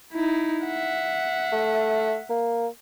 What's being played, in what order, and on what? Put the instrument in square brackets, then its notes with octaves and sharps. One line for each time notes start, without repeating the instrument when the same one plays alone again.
[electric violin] D#4 E4
E5 F#5
[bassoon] A3
A#3